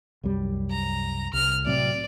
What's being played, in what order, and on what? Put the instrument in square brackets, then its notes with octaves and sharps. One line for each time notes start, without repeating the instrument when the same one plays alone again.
[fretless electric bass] C2 F#2 G3
[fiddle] A#5
[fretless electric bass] C2 [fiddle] F6
[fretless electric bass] A2 C3 F#3 [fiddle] D5